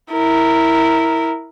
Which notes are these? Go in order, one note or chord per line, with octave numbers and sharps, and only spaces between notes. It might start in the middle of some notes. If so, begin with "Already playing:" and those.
E4 A#4